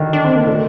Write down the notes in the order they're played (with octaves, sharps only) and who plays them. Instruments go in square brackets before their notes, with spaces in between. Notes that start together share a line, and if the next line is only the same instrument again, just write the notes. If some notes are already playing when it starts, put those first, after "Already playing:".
Already playing: [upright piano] D3 D#3
[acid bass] D4
C4
A#3
[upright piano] D3 [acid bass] A3